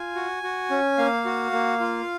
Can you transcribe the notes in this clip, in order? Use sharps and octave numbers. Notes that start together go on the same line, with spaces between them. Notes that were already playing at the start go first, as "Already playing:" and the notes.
Already playing: F4 G#5
F#4
F#4
C#4
A#3 F5
F#4
A#3
F4